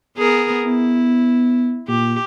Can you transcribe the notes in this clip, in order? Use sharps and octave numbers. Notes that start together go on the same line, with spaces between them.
B3 G#4 A#4
B3 E4
A#2 G4